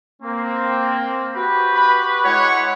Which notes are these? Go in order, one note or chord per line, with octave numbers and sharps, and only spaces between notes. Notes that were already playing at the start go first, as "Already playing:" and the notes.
A#3 C4
F#4 G4 B4
B5
G#3 E4 C#5 F#5